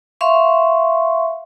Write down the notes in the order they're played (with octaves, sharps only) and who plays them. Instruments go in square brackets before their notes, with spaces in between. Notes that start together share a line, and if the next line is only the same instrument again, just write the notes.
[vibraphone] E5 F5 C6 C#6